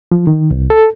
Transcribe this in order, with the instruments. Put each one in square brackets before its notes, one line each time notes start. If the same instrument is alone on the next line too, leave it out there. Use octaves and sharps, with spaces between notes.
[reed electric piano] F3
D#3
C2
A4